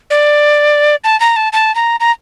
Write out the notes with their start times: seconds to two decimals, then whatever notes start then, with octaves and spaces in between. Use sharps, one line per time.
0.10 D5
1.04 A5
1.20 A#5
1.36 A5
1.53 A5
1.75 A#5
2.00 A#5